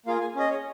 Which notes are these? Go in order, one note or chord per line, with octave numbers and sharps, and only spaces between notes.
A#3 F4 G#4 F5
G#5
C#4 G#4 D#5
C#5